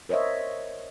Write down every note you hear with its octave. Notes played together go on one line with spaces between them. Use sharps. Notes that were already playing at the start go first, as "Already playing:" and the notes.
A#4 C5 C#5 D#5 E5